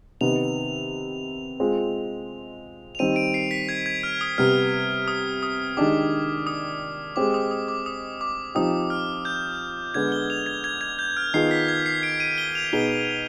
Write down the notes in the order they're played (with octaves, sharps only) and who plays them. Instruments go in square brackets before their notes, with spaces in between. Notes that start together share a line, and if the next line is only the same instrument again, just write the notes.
[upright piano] C3 D#3 B3 [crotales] F7
[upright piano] G#3 C4 F4
[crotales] F7
[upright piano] D#3 G3 C4 [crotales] D#7
[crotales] D7
C7
B6
G#6
G#6
F6
D#6
[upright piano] C3 G3 B3 [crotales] F6
[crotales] D#6
D#6
[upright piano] D#3 G#3 D4 G4 [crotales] D6
[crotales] D#6
[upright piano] G#3 C4 G4 [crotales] D6
[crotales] D#6
D#6
D6
D#6
D6
[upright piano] F3 C4 D#4 G4 [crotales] D#6
[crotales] F6
G6
[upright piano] D3 G#3 B3 [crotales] G#6
[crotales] G7
F7
G#6
G#6
G#6
G6
F6
[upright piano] D#3 B3 F4 G#4 [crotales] C7
[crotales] B6
G#6
C7
D7
D#7
G7
F7
[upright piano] B2 B3 D#4 G#4 [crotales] G7